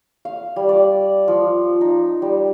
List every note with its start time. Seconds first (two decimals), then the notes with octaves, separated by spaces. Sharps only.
0.25 F5
0.56 G3
0.69 D5
1.28 F3
1.81 D#4
2.22 G3